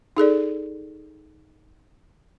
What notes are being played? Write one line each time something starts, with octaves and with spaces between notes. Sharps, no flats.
D#4 G#4 A4 D5